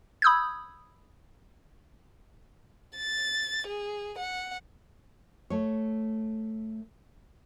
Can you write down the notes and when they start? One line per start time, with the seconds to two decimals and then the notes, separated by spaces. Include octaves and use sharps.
0.22 B5 D#6 E6 G6 G#6
2.97 A6
3.67 G#4
4.18 F#5
5.50 A3 C#5